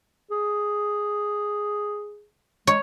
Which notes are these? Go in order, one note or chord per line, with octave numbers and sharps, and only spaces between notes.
G#4
G#3 C#5